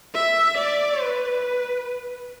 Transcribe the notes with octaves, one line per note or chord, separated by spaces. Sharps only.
E5
D5
B4